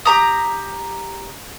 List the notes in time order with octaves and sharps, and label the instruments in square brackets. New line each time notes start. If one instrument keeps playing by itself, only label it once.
[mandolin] G4 A#5 D#6